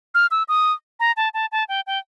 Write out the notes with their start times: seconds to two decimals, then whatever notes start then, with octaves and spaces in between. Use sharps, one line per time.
0.15 F6
0.31 E6
0.48 D#6
1.00 A#5
1.17 A5
1.34 A5
1.52 A5
1.69 G5
1.87 G5